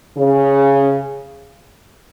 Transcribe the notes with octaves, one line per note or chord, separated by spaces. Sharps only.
C#3